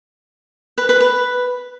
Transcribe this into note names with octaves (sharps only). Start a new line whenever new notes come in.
B4
B4
B4